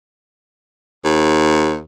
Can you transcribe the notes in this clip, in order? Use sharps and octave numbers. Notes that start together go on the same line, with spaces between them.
D#2